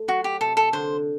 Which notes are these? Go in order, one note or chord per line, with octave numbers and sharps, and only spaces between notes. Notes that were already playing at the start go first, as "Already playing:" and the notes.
Already playing: A3
F#3 F#4
G4
C3 A4
A4
D3 C5